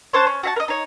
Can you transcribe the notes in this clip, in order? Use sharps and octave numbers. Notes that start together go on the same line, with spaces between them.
C#4 C5 A5 F#6
C#4
F#4 E5 A5
A#4 D#5
D#4 C#5